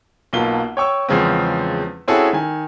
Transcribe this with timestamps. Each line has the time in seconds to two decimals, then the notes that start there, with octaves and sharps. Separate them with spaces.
0.33 B1 B2 A#3 F4 G7
0.77 C#5 G5 C#6 E6
1.08 E2 C#3 F3 G#3 C4
2.08 C4 C#4 E4 F#4 G#4 A4
2.33 D#3 G#5